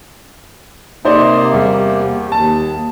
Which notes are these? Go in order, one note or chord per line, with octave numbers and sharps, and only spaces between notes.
C3 A#3 D#4 C5 D5
E2 G3
D#2 A5